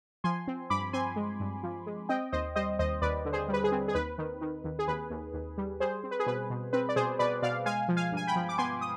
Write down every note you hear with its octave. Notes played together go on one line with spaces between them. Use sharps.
F3 G#5 C6
C4
G2 B5 D6
C4 G#5 C6
G#3
G2
F3
G#3
C4 D#5 G5
D#2 C5 D#5
G3 C5 D#5
D#2 C5 D#5
D#2 B4 D5
D3
G#4 C5
G3 B4
G#4
C4
G#4
D#2 B4
D#3
D#3
D#2
G#4
D#2 B4
D#2
D#2
G3
G3 G#4 C5
C4
B4
G#4
B2 B4
B2
C4 B4
D5
B2 G#4 C5
B2 B4 D5
B2 D5 F5
G#3 F5 G#5
F3
F5 G#5
G2 G#5
G5 B5
F3
D6
B3 G#5 C6
D#6